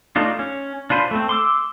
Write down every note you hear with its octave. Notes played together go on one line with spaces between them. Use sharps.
A3 D4 D#4 F4
C#4
D4 F4 B4 C5
A3 C4
C6 D6 E6